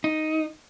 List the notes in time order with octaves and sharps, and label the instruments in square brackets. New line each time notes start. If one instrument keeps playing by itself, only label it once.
[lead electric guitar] D#4